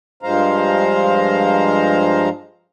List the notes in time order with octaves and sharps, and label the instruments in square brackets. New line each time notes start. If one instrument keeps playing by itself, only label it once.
[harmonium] G2 F3 G#3 C5 F5 A#5